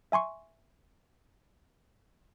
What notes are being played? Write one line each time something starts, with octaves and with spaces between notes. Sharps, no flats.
E5 G#5 C6 C#6